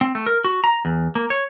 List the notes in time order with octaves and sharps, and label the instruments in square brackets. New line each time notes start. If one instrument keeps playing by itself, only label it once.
[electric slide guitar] C4
A3
A#4
F#4
A#5
E2
A#3
C#5